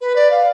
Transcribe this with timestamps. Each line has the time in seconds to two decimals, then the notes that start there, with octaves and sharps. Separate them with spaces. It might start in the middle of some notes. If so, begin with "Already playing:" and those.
0.01 B4
0.16 D5
0.31 F5